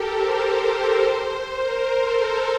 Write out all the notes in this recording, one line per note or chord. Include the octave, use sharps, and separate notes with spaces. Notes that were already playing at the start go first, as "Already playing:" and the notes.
Already playing: G4 A4 A#4
C5
C5
C5
A#4
A4